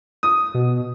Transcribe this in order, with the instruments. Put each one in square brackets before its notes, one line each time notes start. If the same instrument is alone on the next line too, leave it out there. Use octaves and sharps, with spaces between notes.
[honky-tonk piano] D#6
[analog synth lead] B2